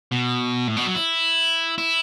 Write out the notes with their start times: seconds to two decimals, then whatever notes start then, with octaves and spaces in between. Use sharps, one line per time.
0.12 B2
0.67 A2
0.76 B2
0.86 F#3
0.95 E4
1.78 E4